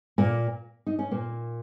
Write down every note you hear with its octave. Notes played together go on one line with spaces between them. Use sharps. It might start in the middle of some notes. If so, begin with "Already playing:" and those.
A#2 A#3
D#4
C#4
A#2 A#3